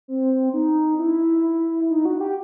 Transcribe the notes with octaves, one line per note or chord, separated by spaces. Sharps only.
C4
D#4
E4
D#4
F#4
G4